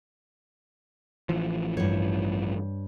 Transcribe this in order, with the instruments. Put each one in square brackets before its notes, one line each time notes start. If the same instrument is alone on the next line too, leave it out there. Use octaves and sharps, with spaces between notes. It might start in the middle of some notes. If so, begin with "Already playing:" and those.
[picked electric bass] A1 E3 F3
[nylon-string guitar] G2 C#5